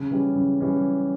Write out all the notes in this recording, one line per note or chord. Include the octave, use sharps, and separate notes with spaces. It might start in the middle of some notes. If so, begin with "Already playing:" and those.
Already playing: C#3
E3 G3 C#4
C#3
E3 G3 C#4